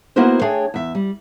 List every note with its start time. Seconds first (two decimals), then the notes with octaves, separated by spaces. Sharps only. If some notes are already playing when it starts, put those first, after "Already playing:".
0.16 A#3 B3 E4 F#4 A#4 C5
0.41 A3 D4 G#4 C#5 G5
0.74 E2 E5
0.95 G3